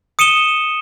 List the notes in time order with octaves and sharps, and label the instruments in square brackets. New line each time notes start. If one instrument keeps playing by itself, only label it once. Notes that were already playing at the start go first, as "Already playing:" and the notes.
[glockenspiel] D#6 C#7 D#7 E7 G7